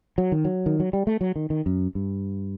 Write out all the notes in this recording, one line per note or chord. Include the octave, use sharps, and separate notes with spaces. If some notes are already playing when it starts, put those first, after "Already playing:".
F#3
D#3
F#3
D#3
F#3
G3
A3
F#3
D#3
D#3
F#2
G2